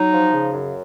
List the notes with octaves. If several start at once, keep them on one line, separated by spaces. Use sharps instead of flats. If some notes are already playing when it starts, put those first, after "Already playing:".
Already playing: F#3 D#4
F3
C#3
F#2